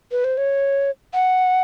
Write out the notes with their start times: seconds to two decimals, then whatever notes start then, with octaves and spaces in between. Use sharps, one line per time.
0.12 B4
0.24 C5
0.38 C#5
1.14 F#5